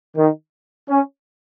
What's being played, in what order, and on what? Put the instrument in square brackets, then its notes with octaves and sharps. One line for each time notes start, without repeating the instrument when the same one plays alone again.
[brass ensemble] D#3
C#4